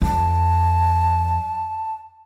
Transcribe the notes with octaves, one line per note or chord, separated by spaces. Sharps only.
F2 A5